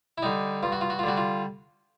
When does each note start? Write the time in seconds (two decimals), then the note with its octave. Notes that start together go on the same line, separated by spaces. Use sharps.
0.18 E4
0.22 D3 G3 D#4
0.63 G2 F4
0.72 F#4
0.81 F4
0.90 F#4
0.99 F4
1.03 D3 G3 F#4
1.17 F4